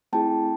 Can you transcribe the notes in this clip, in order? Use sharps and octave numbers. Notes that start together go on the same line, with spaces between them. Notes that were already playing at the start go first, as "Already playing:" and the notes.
A3 C4 E4 G#4 G5 A5